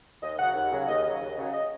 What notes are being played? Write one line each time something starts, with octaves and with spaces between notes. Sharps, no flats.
D#2 D#5
C#3 F#3 F#5
D#2 F#5
C#3 F#3
D#2 D#5
C#3 F#3 D#5
D#2
C#3 F#3
D#5